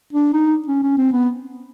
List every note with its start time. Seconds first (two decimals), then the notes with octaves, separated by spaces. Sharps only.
0.13 D4
0.33 D#4
0.68 C#4
0.83 C#4
0.97 C4
1.13 B3